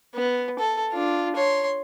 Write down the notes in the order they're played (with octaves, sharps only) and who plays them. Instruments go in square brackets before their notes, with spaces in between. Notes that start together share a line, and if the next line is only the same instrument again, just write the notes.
[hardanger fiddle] B3
A4
D4 F4
C#5 C6